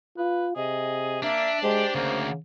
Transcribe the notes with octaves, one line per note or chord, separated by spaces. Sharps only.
F4 B4
C3 G#4 D#5
A#3 D4 E5
G#3 G4 C5
D2 C#3 A#3